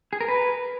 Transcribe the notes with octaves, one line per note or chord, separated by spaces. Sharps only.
G#4
A#4
B4